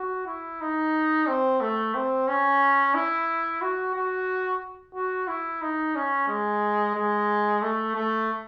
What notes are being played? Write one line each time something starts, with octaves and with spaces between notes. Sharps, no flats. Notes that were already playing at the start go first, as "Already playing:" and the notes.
Already playing: F#4
E4
D#4
C4
A3
C4
C#4
E4
F#4
F#4
F#4
E4
D#4
C#4
G#3
G#3
A3
A3